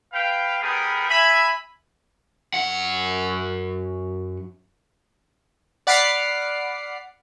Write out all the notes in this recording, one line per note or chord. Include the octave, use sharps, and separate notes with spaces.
B4 F5 G5
G3 B3 G4 G#4 A#4 B4
E5 G#5 B5
F#2 F#5
D5 F#5 B5 D6 F6 C7